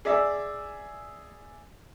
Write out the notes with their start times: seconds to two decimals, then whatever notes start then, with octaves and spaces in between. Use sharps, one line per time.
0.05 G#4 D5 E5 E6